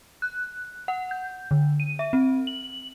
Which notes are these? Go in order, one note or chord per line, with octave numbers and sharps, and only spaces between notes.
F#6
F#5
G6
D3
D#7
E5
C4
F#7